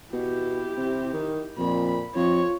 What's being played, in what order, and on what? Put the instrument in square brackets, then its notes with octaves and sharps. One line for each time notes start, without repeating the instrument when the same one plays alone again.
[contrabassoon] B2 [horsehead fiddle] E4 G4
[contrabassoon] C3
D#3
[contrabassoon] F2 [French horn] A#2 [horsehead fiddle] B5
[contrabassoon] F2 [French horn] F4 [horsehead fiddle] C#5